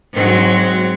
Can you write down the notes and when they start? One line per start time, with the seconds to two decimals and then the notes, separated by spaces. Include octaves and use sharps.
0.13 G#2 F#3 C4